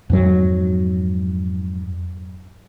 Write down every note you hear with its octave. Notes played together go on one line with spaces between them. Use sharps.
F2 G#2 F#3